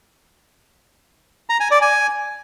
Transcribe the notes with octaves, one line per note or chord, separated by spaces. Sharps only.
A#5
G#5
D5
G#5